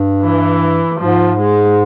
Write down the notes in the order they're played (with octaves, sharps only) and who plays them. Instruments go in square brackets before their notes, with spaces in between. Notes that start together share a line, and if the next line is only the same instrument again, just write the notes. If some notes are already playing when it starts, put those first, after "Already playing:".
Already playing: [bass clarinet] G2
[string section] E3
[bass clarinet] G#2 [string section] F3
[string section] G#3